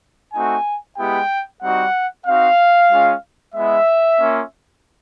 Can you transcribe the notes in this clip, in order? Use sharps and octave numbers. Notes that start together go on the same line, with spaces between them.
A3 C4 D#4 F#4 G#5
G#3 B3 E4 G4 G5
G3 C4 D#4 F#4 F#5
C4 D#4 F#4 F5
G#3 C#4 F4
G#3 B3 E4 E5
A#3 C#4 F4